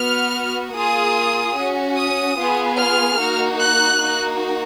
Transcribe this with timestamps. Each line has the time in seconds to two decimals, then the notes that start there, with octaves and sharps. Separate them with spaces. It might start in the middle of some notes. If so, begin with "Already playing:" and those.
Already playing: B3 F#4 F6
0.74 A#3 F4 G#4 D#6
1.56 C#4 F#4
1.96 D#6
2.36 B3 F4 G#4
2.77 F6
3.18 A#3 D#4 F#4
3.59 F#6
3.99 A#3 D#4 F#4